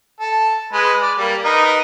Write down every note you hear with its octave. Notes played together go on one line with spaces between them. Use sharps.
A4
G#3 B4
D5
G3 A#3
D#4 A#4 B4